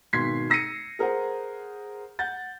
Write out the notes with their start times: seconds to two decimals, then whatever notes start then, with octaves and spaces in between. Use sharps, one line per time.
0.13 G#1 B2 C6 G#6 B6 C7
0.50 E6 A#6 C7 C#7 D#7
0.99 G#4 A#4 C5 F#5
2.19 F#5 G6 A6